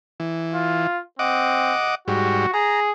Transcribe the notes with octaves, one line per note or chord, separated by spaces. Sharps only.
E3
F4
C4 D#5 F#5 D6
G#2 G3 F#4
G#4 A#5